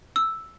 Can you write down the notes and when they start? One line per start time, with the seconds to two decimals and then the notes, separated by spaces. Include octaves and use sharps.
0.16 E6